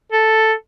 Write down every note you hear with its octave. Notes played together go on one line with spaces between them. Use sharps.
A4